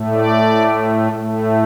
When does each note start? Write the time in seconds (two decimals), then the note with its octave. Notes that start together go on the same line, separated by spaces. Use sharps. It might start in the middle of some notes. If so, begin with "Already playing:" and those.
Already playing: A2 A3
0.14 D5
1.12 A2 A3